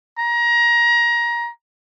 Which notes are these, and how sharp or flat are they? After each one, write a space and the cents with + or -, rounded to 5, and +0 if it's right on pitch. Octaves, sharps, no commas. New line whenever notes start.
A#5 +25